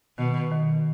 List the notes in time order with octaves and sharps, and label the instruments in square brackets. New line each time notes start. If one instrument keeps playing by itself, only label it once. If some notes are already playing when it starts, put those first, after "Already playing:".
[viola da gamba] B2 [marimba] D#3
[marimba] D#3